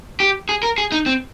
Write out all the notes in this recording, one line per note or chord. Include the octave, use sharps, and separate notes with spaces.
G4
G#4
A#4
G#4
D#4
C4